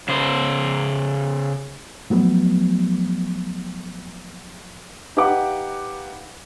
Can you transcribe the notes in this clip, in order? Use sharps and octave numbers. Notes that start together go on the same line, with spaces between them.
C#3 C5
F3 F#3 A3 B3
D#4 G4 B4 F5 F#5 D6